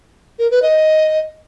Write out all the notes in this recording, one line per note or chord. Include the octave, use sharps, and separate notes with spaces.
A#4
B4
D#5